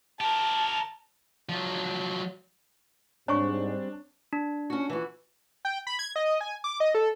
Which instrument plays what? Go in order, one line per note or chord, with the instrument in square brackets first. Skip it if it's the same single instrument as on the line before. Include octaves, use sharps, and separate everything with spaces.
[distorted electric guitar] G4 A#4 [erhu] A5
[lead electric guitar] F3 F#3
[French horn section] G#2 [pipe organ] G3 C4 [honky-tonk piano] D4 [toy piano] C#5 G#5 C#6
[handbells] D4
[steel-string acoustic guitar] C#4 F#4
E3 F#4
[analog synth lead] G5
B5
G#6
D#5
G#5
D6
D#5
A4